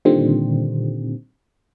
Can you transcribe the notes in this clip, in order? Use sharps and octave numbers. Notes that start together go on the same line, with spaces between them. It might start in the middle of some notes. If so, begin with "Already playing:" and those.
A#2 D3 D#3 G3 C4